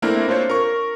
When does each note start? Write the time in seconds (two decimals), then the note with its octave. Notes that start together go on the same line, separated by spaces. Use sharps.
0.02 A3 A#3 C4 D4 E4 A#4
0.28 C4 D4 F4 C5 C#5
0.50 A#4 C#6